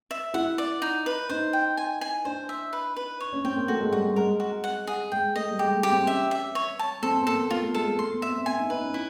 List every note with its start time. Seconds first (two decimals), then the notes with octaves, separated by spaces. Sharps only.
0.11 E5
0.34 E4 F#5
0.58 D5
0.82 D#4
1.06 B4
1.29 D#4 C5
1.53 G5
1.77 G#5
2.01 G#5
2.25 D4 C5
2.49 E5
2.73 B4
2.97 B4
3.21 C#5
3.32 C#4
3.44 C4 G5
3.57 A#3
3.68 A3 F#4
3.81 G#3
3.92 G3 F#4
4.04 G#3
4.16 G#3 A#4
4.40 F#4
4.64 F#5
4.87 G#4
5.12 G#3 G5
5.35 A3 D#5
5.51 G3
5.59 G#3 G4
5.76 A3
5.83 G4
5.91 C4
6.07 C#4 E5
6.31 E5
6.55 C#5
6.79 A5
7.03 C4 A4
7.21 B3
7.27 A#3 A4
7.50 B3 F4
7.62 A3
7.74 G#3 A4
7.86 G#3
7.98 A3 C6
8.14 B3
8.22 E5
8.30 C4
8.46 C4 G#5
8.58 D#4
8.70 D#4 B4
8.82 C#4
8.94 E4